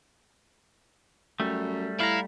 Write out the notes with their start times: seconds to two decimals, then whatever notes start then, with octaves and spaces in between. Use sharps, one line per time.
1.40 F#2 G3 A3
2.01 A2 E4 F5 A#5